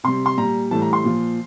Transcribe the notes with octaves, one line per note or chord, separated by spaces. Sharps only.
C3 G3 C6
C6
A#2 G3 A#5
A2 E3 G3 A5
A#5
C6
A#2 F3